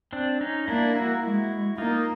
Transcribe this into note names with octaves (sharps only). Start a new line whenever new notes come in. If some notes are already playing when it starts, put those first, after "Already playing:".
C4 D4
C#4 D#4
A#3 D4 E4
E4 F#4
G#3 E4 F#4
A#3 D#4 F4